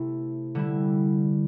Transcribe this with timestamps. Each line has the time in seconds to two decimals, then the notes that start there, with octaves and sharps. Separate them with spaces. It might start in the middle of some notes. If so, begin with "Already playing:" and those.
Already playing: C3 A3 E4
0.55 D3 G3 E4